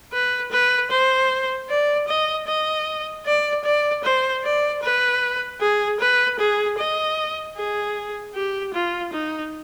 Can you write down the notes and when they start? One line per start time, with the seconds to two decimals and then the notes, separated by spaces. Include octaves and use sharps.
0.13 B4
0.51 B4
0.90 C5
1.69 D5
2.08 D#5
2.47 D#5
3.26 D5
3.64 D5
4.03 C5
4.43 D5
4.82 B4
5.60 G#4
6.00 B4
6.39 G#4
6.78 D#5
7.56 G#4
8.35 G4
8.74 F4
9.13 D#4